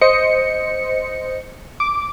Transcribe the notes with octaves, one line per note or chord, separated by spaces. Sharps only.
C5 D#5 C#7
D6